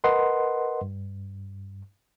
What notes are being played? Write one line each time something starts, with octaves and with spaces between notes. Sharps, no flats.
A#4 B4 D#5 F#5 C6
G2